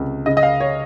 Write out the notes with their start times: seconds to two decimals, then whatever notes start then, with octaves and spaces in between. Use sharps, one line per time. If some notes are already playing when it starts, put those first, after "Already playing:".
Already playing: C#2 C3
0.26 C#3 D#5
0.37 D#5
0.43 F5
0.60 C#5